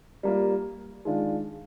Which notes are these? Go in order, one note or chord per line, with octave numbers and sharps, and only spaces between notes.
G3 A#3 F4
D#3 G#3 D4 F4